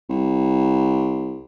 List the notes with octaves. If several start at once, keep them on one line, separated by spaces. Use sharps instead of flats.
C2